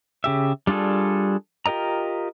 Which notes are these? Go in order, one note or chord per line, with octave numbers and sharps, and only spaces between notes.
C#3 G4 E5
G3 D4 F4 G#4 A4
F4 G4 A#4 D#5 A#5